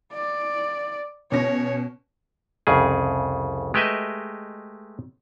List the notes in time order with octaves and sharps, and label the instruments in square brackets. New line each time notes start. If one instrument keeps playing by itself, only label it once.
[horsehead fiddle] D5
[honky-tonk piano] B2 C#4 A#6 [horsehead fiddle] C#5
[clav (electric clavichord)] C2 F2 C#3 G#4
G#3 A3 G4 B4 D#5 E5